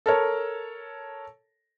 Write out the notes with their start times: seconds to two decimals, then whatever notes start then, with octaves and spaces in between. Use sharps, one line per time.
0.06 A4 A#4 C#5